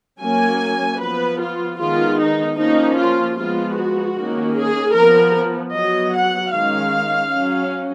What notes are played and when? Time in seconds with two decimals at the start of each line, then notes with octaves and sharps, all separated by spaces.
0.21 F#3 A#3 C#4 G#5
1.00 F3 B3 B4
1.40 F4
1.79 D#3 G#3 B3 F4
2.19 D#4
2.58 F3 A#3 C#4 D#4
2.97 F4
3.37 F3 G#3 B3 F4
3.76 F#4
4.16 D#3 A#3 C#4
4.55 G#4
4.95 F3 B3 A#4
5.74 F#3 B3 D#5
6.14 F#5
6.53 D#3 G#3 C#4 F5
7.32 F#3 C#4